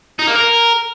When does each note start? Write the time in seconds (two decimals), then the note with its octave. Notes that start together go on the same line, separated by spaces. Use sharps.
0.19 D#4
0.27 A#3
0.35 A#4